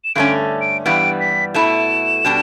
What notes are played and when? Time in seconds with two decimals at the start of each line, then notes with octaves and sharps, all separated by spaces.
0.04 E7
0.15 G2 D3 A3 C#4 D7
0.61 D7
0.85 G2 E3 G3 B3 D7
1.20 B6
1.54 B2 A3 E4 E7
2.25 B2 G3 D4